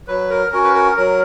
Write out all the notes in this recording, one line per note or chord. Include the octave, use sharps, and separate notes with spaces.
F#3 B4
A#4
C#4 F#4 A#4
B4
A#4
F#3 A#4